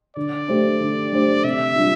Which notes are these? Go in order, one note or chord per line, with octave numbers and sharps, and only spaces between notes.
D3 D5
A3 D4 G4 C5
D3
A3 D4 G4 C5
C3 E5
G3 D4 F4